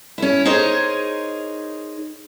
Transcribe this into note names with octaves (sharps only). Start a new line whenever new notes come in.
C#4 E4
D#4 G#4 A#4 C5 C#5 D#5